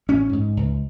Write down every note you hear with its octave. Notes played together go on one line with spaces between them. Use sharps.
A1 C#4
G#2
C#2